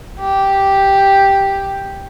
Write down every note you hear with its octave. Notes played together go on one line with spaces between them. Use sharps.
G4